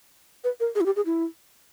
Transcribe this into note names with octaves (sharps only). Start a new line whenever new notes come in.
B4
A#4
G#4
E4
G4
G#4
E4